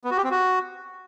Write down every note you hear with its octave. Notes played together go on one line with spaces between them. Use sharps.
B3
F#4
G4
C4
F#4